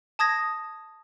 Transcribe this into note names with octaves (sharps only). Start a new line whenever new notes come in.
A5 D#6 G#6 A#6